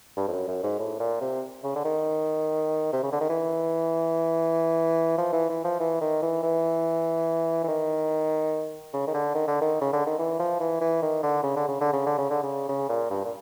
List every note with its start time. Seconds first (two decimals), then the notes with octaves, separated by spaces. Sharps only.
0.17 G2
0.28 F2
0.33 F#2
0.48 F#2
0.64 G#2
0.79 A2
1.00 A#2
1.21 C3
1.64 C#3
1.76 D3
1.85 D#3
2.93 C3
3.03 C#3
3.12 D3
3.21 D#3
3.30 E3
5.18 F3
5.33 E3
5.50 E3
5.65 F3
5.80 E3
6.01 D#3
6.22 E3
6.43 E3
7.64 E3
7.68 D#3
8.93 C#3
9.07 D#3
9.14 D3
9.35 D#3
9.47 D3
9.61 D#3
9.81 C#3
9.93 D3
10.06 D#3
10.19 E3
10.40 F3
10.60 E3
10.81 E3
11.02 D#3
11.23 D3
11.43 C#3
11.56 D3
11.68 C#3
11.81 D3
11.93 C#3
12.06 D3
12.18 C#3
12.31 D3
12.43 C#3
12.69 C#3
12.89 A#2
13.10 G2
13.25 A#2